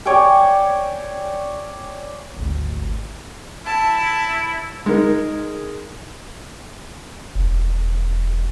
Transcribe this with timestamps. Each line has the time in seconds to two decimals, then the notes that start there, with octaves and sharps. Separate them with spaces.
0.06 C#5 D5 G5 G#5
2.37 G#1 D2
3.66 E4 A5
4.86 G#3 D#4 A#4
7.35 E1